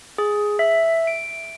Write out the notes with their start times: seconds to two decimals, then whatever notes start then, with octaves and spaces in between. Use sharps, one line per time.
0.18 G#4
0.59 E5
1.07 D7